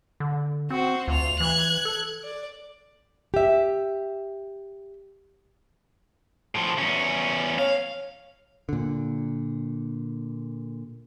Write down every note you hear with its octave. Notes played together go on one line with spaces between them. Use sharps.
D3
C4 F#4 C5
D2 F4 F7
E3 F#6 G#6
A4
D5
G4 E5
A2 F3
E2 C#4
C#5 F5
A#2 D3